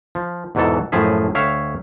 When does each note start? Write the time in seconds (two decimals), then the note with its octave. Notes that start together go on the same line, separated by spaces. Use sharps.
0.15 F3
0.55 E2 G#2 B2 E3 A4
0.92 F#2 A2 F3 G#4 E5
1.35 D2 C#5 E5 F5 G5